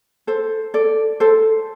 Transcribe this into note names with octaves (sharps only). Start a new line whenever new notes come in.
A4 C5
A4 D5
A4 C5